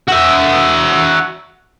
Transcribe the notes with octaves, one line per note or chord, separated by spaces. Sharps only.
F#4 E5